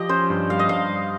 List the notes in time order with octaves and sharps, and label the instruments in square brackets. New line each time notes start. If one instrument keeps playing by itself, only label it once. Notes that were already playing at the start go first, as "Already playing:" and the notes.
Already playing: [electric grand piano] F3 G4 [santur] D#5
[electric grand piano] C#4 [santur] C5
[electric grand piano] G2
[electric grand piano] G3 [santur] F5
[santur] D#5
[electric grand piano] G2 [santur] F5
[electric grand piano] G3